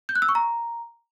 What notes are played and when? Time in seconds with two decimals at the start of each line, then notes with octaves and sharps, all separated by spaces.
0.09 G6
0.15 F#6
0.22 E6
0.29 C#6
0.35 A#5